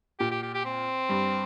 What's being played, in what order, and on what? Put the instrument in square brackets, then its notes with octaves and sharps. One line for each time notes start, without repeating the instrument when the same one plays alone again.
[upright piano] A#2 [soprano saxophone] G4
[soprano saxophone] G4
G4
G4
C4
[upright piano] G2